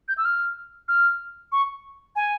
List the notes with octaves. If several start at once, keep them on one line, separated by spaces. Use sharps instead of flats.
G6
E6
F6
F6
C#6
G#5